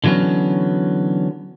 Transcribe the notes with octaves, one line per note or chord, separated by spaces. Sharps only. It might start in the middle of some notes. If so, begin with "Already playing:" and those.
D3 E3 F#3 B3 C#4